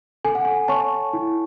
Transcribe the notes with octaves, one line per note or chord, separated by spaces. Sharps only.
A4 G#5
F#5
G#5
C#5 A5 C#6
E4